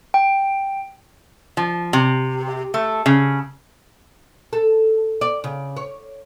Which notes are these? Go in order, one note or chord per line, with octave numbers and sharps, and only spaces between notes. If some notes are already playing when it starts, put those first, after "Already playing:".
G5
F3
C3
A3
C#3
A4
D5
C#3
C#5